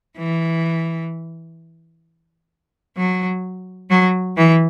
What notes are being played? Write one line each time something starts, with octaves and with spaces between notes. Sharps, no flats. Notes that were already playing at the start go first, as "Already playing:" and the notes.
E3
F#3
F#3
E3